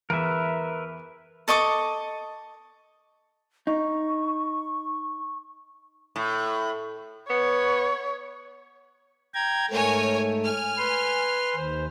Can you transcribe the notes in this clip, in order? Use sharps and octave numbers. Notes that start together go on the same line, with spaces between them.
E2 A#4 B4 E5
A4 D#5 C#6 D6
D#4 C#6
A2
B3 C#5
G5 A#5 G#6
G#2 A3 A#4 C#5 G#5
G#5 F6
B4 C6
D#2 C5